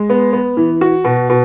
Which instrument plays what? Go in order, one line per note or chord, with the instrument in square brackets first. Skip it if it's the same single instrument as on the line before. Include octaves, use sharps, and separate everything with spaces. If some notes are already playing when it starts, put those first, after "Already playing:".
Already playing: [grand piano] G#3
B3
B3
E3
F#4
B2
B2